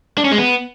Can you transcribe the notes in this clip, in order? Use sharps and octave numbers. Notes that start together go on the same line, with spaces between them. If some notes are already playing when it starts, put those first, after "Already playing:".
D4
C#4
G#3
B3